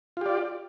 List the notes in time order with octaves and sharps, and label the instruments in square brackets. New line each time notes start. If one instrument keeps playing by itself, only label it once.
[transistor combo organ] F4
G4
D5